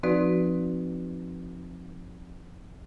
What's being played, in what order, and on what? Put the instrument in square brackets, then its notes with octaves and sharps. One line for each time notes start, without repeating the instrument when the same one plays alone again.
[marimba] F3 C4 D#4 F#4 B4 D5